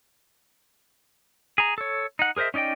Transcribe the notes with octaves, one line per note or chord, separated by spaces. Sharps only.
G#4 A#5
A4 C#5
D#4 F#5
G#4 A#4 C5 D#5 E5
C#4 D#4 D5 D#5 G5